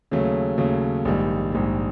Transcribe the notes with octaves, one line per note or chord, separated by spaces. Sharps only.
D#2 C#3 F#3 A3
D#2 C#3 F#3 A3
A#1 G#2 D#3 G3
A#1 G#2 D#3 G3